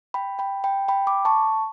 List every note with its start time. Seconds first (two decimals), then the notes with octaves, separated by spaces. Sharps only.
0.14 G5 B5
0.39 G5 B5
0.64 G5 B5
0.88 G5 B5
1.07 B5 D6
1.25 A5 C#6